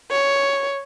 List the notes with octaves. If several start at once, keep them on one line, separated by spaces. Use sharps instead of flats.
C#5